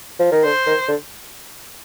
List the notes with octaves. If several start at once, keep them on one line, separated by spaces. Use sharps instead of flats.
F3
D#3
D3 C5
D#3
D3